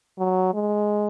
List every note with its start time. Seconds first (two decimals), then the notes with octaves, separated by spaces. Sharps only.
0.18 F#3
0.54 G#3